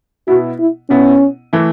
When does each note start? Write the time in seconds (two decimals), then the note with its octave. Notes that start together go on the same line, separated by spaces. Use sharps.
0.28 B2 B3 E4 F#4
0.59 E4
0.90 B2 B3 C#4 E4
1.53 E3 A3 E4